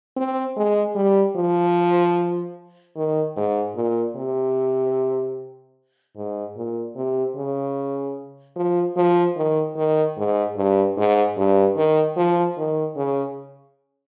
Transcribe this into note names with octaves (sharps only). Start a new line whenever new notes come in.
C4
G#3
G3
F3
D#3
G#2
A#2
C3
G#2
A#2
C3
C#3
F3
F3
D#3
D#3
G#2
G2
G#2
G2
D#3
F3
D#3
C#3